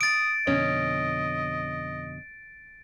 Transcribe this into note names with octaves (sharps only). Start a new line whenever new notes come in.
D#6 A6 D7
F2 B2 D3 C#4 D#5